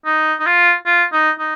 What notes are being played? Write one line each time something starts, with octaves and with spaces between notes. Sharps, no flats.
D#4
D#4
F4
F4
D#4
D#4